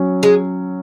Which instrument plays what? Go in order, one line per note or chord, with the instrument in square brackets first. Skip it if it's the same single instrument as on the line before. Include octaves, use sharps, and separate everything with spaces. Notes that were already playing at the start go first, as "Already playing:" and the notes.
Already playing: [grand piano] F#3 C#4
[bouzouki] G#3